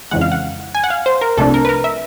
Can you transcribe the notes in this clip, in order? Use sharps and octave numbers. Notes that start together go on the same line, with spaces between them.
F2 C#3 E3 G#3 F#5
F5
F#5
G#5
F#5
F5
C5
A#4
C2 C3 F3 A3 D4 A4
A#4
B4
A#4
E5